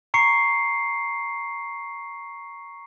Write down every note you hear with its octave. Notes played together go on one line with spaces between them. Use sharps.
A#5 C#6 C7 C#7